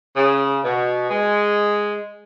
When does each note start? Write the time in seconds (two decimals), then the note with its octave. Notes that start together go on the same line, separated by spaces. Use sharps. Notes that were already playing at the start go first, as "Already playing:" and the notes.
0.16 C#3
0.64 B2
1.10 G#3